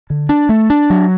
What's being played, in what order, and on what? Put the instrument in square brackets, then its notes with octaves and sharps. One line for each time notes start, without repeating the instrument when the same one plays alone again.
[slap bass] D3
D4
A3
D4
F#3